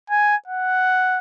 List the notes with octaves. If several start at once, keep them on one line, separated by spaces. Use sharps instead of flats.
G#5
F#5